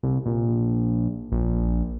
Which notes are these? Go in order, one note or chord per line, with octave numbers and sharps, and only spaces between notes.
C2
A#1
A#1